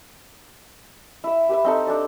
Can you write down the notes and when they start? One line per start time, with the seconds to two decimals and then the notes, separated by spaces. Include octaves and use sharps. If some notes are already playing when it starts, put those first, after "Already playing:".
1.24 E4 E5
1.49 G4 B4 E5
1.64 C4 D#4 A4
1.87 D4 A4 D5